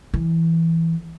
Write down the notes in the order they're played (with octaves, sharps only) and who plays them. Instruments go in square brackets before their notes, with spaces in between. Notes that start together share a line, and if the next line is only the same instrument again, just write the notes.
[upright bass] E3